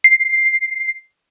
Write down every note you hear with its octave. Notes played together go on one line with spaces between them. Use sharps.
C7